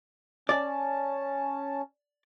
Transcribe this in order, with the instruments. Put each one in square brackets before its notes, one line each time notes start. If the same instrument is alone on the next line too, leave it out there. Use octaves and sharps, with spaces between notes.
[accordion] C#4 A5 [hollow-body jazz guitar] D5